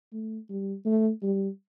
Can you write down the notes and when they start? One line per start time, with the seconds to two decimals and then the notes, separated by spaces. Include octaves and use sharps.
0.13 A3
0.50 G3
0.85 A3
1.23 G3